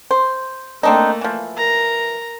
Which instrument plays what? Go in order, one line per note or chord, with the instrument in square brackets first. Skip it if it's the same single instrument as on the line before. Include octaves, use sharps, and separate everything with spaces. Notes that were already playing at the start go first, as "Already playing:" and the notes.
[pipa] C5
[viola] A3 A#3 [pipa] C4 D4 D#4
[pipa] E3 F3
[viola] A#4 A#5